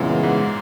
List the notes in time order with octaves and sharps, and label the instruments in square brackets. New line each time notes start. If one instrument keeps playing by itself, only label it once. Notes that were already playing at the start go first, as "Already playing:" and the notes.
Already playing: [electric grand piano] F#2 A#2 [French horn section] C#3 E3 G#3 B3
[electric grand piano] G#2